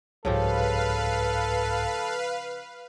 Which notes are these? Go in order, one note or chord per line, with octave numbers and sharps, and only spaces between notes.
C2 G#2 C#3 F3 G4 A4 B4 F5